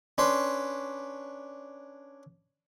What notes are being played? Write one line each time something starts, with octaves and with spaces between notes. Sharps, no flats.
C#4 D4 B4 C6